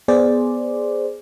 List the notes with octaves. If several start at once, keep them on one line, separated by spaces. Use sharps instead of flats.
B3 G#4 C5 D5